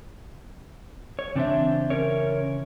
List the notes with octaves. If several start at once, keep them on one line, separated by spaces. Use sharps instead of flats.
C#5
C#3 E3 C4 D4 C5 E5
C#4 A#4 C#5